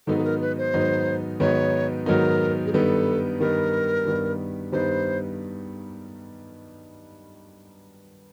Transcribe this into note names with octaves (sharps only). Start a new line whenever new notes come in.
G#2 D#3 F#3 B3 D#4 A4
A4
A#4
B4
C5
G#2 D#3 F#3 B3 D#4
G#2 D#3 F#3 B3 D#4 C#5
G#2 D#3 F#3 B3 D#4 A#4
G#4
G2 D#3 G3 B3 D#4 A4
G2 D#3 G3 B3 D#4 A#4
G2 D#3 G3 B3 D#4
G2 D#3 G3 B3 D#4 C5